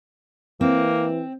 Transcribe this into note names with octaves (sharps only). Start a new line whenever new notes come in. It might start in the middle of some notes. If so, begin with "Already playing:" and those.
E3 A#3 C4